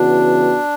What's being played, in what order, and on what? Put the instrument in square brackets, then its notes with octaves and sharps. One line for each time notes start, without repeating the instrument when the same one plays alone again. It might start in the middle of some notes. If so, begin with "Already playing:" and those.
Already playing: [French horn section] C#3 E3 B3 F#4 [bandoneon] D4